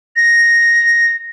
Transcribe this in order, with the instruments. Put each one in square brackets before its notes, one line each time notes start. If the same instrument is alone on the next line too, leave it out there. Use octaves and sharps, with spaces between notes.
[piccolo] A#6